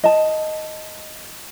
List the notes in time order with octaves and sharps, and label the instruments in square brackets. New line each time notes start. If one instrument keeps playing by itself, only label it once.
[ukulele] D#5 A5